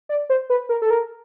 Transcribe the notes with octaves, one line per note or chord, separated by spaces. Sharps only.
D5
C5
B4
A#4
A4
A#4